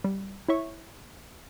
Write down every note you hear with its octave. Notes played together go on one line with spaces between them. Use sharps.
G3
E4 C#5 E5 C#6